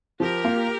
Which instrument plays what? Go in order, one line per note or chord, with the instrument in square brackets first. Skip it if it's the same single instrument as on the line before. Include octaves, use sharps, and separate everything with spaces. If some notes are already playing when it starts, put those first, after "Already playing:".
[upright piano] F3 [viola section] G4 A#4
[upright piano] A#3 F4